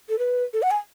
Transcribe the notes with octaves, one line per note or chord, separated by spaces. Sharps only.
A4
B4
A4
F#5
G#5